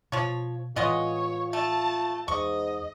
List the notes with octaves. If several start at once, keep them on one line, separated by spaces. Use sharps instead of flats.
B2 F3 C#5
A2 E3 G#3 B3 F4 C#5 D#5
A3 A5
E2 G#2 D#5 C#6